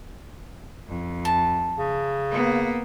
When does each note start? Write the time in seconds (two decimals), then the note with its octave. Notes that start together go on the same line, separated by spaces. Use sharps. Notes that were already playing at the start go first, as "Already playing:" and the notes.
0.88 F2
1.25 A5
1.78 C#3
2.31 A#3 B3